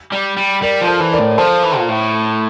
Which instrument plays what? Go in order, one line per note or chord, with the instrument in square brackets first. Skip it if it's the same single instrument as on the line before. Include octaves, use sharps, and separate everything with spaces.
[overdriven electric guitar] G3
G3
[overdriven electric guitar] G3 [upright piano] A#4 D5
[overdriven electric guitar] F3
[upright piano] A4 C5
[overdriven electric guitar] E3
[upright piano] A#4 D5
[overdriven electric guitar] A2
[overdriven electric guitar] F3 [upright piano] A4 C5
[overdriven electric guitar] E3
A#2
A2